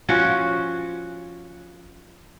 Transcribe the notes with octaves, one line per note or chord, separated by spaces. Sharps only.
F3 C#4 F#4